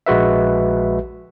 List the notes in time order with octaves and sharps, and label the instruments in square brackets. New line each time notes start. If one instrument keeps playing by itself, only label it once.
[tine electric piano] A#1 G#3 F#4 B4 E5